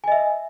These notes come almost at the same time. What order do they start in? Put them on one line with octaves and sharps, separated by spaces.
G#5 D#5 E5